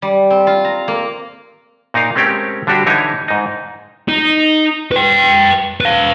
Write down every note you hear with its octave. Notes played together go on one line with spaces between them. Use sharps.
G3
C4
F4
A#5
A#3
A#2 D#4 A#4 F5
G#3 A3 C4 C#4 G4 A#4
D3 G3 D4 F#4 G4
D3 E3 D#4 E4 C#5
G#2 D#4
D#4
B4 G5
B4 F5